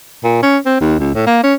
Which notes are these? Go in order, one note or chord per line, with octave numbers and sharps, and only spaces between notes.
A#2
C#4
C4
D#2
C#2
A2
A#3
C#4